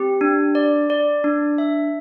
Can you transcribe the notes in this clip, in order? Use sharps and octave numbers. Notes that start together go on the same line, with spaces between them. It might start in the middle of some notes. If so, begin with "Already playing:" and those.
Already playing: C4 G4
D4
D5
D5
D4
E5